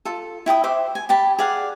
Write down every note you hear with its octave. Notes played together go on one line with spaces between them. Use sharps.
F4 A4
E4 G5 A5 D#6
C5 E5 D6
G#5
G4 G5 A5 B5
G#4 D5 F5 F#5